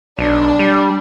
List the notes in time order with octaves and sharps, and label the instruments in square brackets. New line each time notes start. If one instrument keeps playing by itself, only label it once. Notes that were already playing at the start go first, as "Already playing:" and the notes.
[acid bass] B1 [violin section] D4
[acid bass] G3